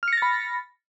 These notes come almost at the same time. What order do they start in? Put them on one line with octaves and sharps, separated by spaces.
F6 C#7 A#6 A6 B5